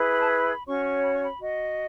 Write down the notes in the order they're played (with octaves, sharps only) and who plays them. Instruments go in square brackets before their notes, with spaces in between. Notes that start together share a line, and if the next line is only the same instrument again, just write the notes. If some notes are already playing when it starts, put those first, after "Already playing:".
Already playing: [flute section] E4 G#4 B4
B5
A5
B5
C#4 F#4 C#5 C#6
C#6
B5
C#6
B5
F#4 D#5